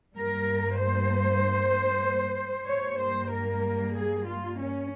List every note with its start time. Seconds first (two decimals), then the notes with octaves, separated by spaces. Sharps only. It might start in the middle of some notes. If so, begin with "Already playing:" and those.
0.15 G2 G3 A#3 A#4
0.78 C5
2.68 G2 G3 A#3 C#5
2.99 C5
3.31 A#4
3.95 G#4
4.26 F4
4.58 C#4